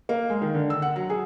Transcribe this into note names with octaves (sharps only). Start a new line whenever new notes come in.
A#3
G#3
D#3
D3
E6
F#5
F#3
G#4